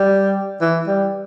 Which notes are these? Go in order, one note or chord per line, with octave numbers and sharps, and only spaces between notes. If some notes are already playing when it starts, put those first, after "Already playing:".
Already playing: G3
E3
G3